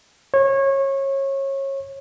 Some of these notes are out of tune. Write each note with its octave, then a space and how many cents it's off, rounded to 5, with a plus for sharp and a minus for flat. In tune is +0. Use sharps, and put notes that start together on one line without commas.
C#5 -25